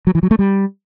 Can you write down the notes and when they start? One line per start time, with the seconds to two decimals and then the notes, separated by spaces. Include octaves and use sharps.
0.07 F#3
0.15 E3
0.23 F#3
0.31 A3
0.39 G3